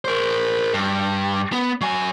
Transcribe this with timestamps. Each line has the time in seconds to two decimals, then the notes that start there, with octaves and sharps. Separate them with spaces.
0.05 A#4 C5
0.74 G2
1.53 B3
1.81 F#3 G#5